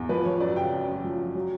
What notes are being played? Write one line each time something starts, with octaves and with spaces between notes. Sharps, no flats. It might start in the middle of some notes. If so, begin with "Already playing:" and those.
Already playing: E2
F3 B4
F3 C#5
F#2 D5
C#3 G5
F#2
F#2
F3
F#2
F#3